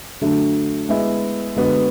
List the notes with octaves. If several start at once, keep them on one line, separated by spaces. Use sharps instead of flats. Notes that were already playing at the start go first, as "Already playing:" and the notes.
D3 F#3 A3 D4
G#3 B3 E4 G#4
D3 G#3 B3 F#4